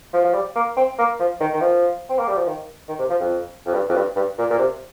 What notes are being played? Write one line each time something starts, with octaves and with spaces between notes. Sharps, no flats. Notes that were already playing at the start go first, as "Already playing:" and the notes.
F3
F3
G3
A#3
C4
A#3
F3
D#3
D#3
F3
C4
A#3
G3
F3
D#3
D#3
C3
F3
F2
F2
G2
F2
G2
G2
A#2
A#2
C3